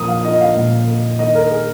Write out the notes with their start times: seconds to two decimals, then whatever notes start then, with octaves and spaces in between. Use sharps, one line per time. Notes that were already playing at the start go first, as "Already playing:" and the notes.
Already playing: A#2 F3 A#3 D#6
0.08 F5
0.24 F4 D#5
0.41 F5
0.57 A#2
0.88 A#3
1.19 D#3 D#5
1.35 A#4
1.51 G#4